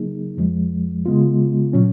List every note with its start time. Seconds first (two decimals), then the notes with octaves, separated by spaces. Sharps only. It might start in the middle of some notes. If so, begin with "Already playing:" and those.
Already playing: C#3 F#3 A#3 D#4 G#4
0.37 F2 F3 G#3
1.06 C#3 G#3 B3 F4
1.73 A#2 F#3 C#4